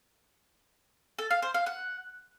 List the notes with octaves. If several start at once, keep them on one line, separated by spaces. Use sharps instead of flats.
A4
F5
C5
F5
F#5